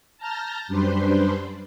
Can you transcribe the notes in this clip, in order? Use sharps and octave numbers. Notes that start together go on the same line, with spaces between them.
A5 A#5 F6 G6 A6 A#6
F#2 G3 D4 B4 C5 C6